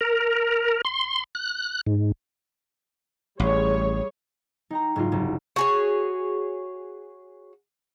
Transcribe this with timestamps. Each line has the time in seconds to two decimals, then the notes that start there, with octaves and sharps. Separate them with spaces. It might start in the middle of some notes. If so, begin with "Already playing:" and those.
0.01 A#4
0.85 C6
1.35 F#6
1.86 G#2
3.40 A1 G3 G#4 C#5
4.70 D#4 G5 A#5
4.96 F#1 G#2 D#4 F4
5.12 F#1 C2
5.56 F#4 G#4 C#5